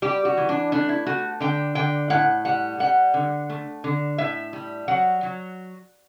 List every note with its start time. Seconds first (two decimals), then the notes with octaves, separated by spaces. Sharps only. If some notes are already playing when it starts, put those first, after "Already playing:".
0.02 G3 G4
0.25 F#4
0.37 E3
0.49 D4
0.72 A3 D4
0.89 E4
1.06 A3 F#4
1.40 D3 G5
1.75 D3 G5
2.10 A2 F#5
2.45 G3 F#5
2.80 G3 F#5
3.14 D3
3.50 A3
3.84 D3
4.18 A2 E5
4.53 G3
4.88 F#3 F#5
5.23 F#3